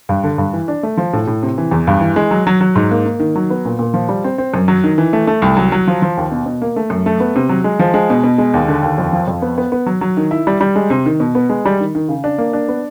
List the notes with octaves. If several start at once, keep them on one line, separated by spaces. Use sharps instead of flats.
G2
D3
G2
E3
D4
A3
F3
A2
A2
C3
E3
E2
G2
E3
G#3
F#3
F#3
F#3
G#2
A#3
A#3
D#3
F#3
B3
A#2
A#2
F3
G3
C4
C4
F#2
F#3
D#3
E3
A3
A3
C2
F#3
F#3
F3
F3
D#2
B2
B2
A#3
A3
F#2
A3
B3
C3
F#3
G#3
F3
G#3
B2
B2
G#3
D#2
D3
D#2
F2
F3
F2
B3
B3
B3
F#3
F#3
D#3
E4
G3
G3
G#3
C3
D#3
B2
B3
G#3
G3
D#3
D#3
C#3
D4
A#3
D4
B3